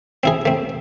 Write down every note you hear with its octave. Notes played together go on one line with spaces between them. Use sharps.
C4 E4 G#4
A3 C4